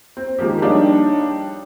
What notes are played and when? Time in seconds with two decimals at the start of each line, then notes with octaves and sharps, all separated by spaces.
0.17 C4
0.39 D#3 F3 G#3 A#3 G4
0.62 G3 D4 D#4 C#5 F5